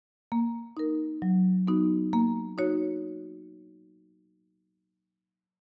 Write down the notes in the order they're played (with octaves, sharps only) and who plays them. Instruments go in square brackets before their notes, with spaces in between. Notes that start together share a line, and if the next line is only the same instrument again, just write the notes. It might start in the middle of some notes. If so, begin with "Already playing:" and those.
[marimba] A#3
D#4 A#4
F#3
B3 D#4 F#4
A#3
D#4 F#4 C#5